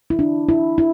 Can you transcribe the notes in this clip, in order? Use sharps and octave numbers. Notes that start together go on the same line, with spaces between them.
E4
D4
E4
E4